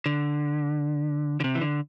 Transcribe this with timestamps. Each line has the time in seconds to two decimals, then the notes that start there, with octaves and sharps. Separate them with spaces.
0.06 D3
1.40 D3
1.44 C3
1.55 E3
1.61 D3